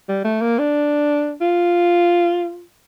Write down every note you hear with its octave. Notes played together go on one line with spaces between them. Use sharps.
G3
A3
A#3
D4
F4